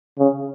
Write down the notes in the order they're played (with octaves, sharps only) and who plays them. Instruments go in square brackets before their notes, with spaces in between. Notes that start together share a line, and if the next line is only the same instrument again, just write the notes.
[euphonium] C#3